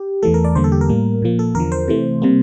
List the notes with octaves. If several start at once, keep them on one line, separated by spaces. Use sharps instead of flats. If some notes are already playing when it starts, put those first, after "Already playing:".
Already playing: G4
E2 E3 A3 A4
A#4
D5
E2 D3 G3 A#3 C5
A4
G4
A#4
A2 G3 A#3
A#2 F3 A#3
A4
E2 D3 F3 A#4
C5
C3 E3 A3
C3 G3 A#3